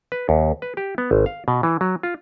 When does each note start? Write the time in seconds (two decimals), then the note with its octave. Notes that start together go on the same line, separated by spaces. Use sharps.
0.12 B4
0.29 D#2
0.62 B4
0.77 G4
0.98 B3
1.11 G#1
1.26 F5
1.48 B2
1.63 E3
1.81 F#3
2.03 F4